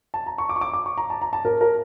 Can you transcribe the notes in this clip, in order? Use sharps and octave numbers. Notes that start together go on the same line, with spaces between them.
A5
A#5
C#6
D6
C#6
D6
D6
C#6
A#5
A5
A#5
A5
A#4
A#4